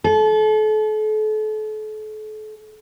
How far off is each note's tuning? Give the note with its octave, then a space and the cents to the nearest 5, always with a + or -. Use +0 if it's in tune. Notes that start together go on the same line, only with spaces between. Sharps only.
A4 -35